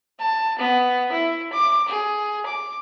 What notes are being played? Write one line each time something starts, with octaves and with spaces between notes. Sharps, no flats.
A5
B3
E4
D6
G#4
D6